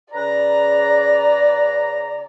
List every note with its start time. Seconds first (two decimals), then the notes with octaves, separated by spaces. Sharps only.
0.14 C#3 B4 D5 A#5